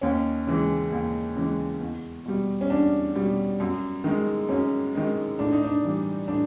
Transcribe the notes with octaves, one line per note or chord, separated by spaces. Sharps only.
D#2 C#4
C#3 E3 G#3
D#2
C#3 E3 G#3
E2
B2 G3
C#4
E2 D4
B2 G3
F#2
D#3 G#3
F#2 C#4
D#3 G#3
A2 D4
D#4
D4
E3 G3
A2 D4